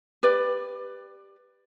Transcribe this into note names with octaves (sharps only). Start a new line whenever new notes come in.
G4 B4 D5